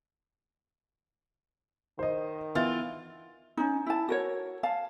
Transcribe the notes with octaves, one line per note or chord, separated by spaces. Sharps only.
D#3 C5 D#5
E3 B3 F4 F6 A6
C#4 D#4
E4 A5
F#4 A#4 C#5
F5 A5